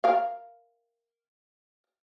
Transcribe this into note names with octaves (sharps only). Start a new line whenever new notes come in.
A#4 F5